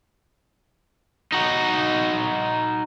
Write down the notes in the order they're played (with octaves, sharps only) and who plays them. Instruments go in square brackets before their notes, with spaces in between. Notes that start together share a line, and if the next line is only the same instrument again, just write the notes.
[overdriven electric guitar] D#4 F#4